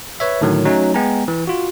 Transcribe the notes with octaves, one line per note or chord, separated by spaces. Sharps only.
B4 C#5 E5
A2 D3 D#3 F#3
F#3 A3 C#4 D#4
G#3 B3 G5 G#5 A#5
E3
F4 F#4